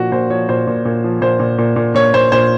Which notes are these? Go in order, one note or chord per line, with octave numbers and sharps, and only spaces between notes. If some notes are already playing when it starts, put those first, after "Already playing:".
Already playing: A#2 F3 F#4
A#2 C5
F3 C#5
A#2 C5
A#2
A#2
F3
A#2 C5
A#2
A#2
A#2
A#2 C#5
A#2 C5
A#2 C5